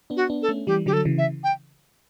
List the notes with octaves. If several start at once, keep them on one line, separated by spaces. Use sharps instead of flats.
B3 D4
F#4
B3 D4
A4
A3 C#4
E3 G3 G4
D3 F#3 G4
A4
C#3 E3
E5
G5